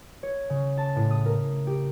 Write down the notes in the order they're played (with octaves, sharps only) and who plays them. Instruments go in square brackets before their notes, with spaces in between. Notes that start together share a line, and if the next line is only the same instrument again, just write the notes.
[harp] C#5
C#3
A5
A2
D#6
A#4
G4